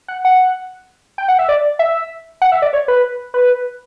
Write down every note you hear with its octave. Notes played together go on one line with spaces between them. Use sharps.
F#5
F#5
G5
F#5
E5
D5
E5
F#5
E5
D5
C#5
B4
B4